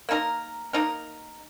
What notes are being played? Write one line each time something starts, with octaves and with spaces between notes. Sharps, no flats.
A#3 D#4 A#4
A#3 D#4 A#4